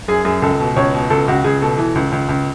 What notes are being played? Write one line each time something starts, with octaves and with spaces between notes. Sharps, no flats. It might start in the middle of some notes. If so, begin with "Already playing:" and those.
F#2 G#4
F#2 G#4
C#2 A4
B2
C#2 C#5
B2
C#2 A4
C#2 F#4
C#2 G#4
B2 A4
E3
C#2
C#2
C#2